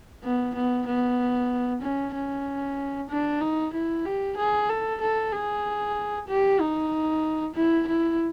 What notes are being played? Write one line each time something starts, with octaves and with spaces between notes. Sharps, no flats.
B3
B3
B3
C#4
C#4
D4
D#4
E4
G4
G#4
A4
A4
G#4
G4
D#4
E4
E4